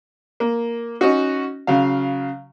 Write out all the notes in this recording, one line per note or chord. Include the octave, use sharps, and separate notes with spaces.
A#3
C#4 D#4 F#4
C#3 F#3 F5